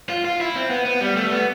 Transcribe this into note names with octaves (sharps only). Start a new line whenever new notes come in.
F4
F4
E4
C4
B3
B3
G3
A3
B3